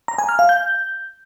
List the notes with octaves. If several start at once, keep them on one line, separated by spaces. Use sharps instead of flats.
A#5
G#5
F6
F5
G6